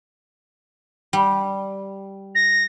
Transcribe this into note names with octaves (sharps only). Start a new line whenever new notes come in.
G3
A#6